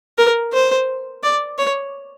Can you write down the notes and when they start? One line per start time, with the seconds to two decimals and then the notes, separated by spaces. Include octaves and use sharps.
0.18 A#4
0.53 C5
1.23 D5
1.58 C#5